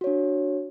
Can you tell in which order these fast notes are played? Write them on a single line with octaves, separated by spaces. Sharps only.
F#4 C#5 D4